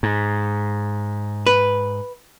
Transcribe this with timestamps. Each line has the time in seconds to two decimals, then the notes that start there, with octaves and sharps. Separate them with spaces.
0.03 G#2
1.47 B4